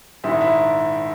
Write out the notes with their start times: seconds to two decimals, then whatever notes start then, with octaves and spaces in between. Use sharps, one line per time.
0.24 A#1 G#2 D#3 E4
0.41 E4